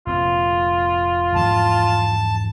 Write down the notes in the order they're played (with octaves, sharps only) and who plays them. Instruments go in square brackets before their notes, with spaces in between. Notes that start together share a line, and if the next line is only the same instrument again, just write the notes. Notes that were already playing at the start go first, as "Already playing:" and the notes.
[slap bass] F1 A#2 C4 [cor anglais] F4
[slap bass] E2 G#2 F3 [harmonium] A5